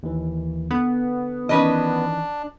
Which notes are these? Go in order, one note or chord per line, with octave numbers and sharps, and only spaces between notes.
D#2 E3
D3 B3
D#3 E3 C#4 D4 B4 D#5